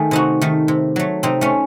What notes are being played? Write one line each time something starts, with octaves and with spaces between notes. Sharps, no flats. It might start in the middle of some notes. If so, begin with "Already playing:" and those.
Already playing: D#3 A3 G#4
C3 D#4 F#4
D#3 A3
C3
F#3 A3
C3 C4 D#4
A3 C#4